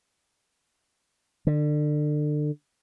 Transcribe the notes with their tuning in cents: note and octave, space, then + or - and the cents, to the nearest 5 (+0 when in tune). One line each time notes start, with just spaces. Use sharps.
D3 +30